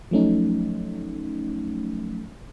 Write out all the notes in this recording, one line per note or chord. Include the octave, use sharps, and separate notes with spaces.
F3 F#3 A3 C#4 D#4